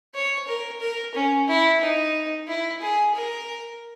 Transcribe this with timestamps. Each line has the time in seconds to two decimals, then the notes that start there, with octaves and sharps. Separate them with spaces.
0.15 C#5
0.47 A#4
0.81 A#4
1.14 C#4
1.47 E4
1.81 D#4
2.47 E4
2.81 G#4
3.14 A#4